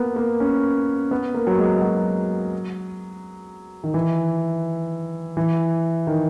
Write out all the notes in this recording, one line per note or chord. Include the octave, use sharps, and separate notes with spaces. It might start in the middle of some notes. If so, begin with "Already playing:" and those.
Already playing: A#3 B3
A#3
C#4
B3
A#3
F#3
G#3
F#3
D#3
E3
E3
D#3